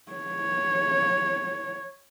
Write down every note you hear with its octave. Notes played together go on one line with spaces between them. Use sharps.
C#5